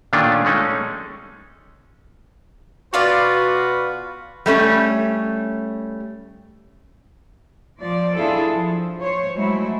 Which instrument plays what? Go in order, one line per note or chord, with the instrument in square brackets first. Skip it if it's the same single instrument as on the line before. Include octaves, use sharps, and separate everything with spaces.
[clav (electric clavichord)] A#2 D#3 A3 C#4 D4 F4
G#3 A3 C#4 D#4
[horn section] B2 F#4 B4 [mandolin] F4 D5 F5
[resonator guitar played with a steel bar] G3 A3 C#4
[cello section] F3 D5
D4 E4 F4 G#4 A4
F3
C5 C#5
F#3 G#3 A3 E4